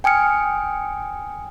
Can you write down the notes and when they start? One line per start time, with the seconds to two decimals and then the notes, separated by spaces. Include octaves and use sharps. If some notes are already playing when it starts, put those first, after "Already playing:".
0.04 G5 G#5 D#6 F6 C#7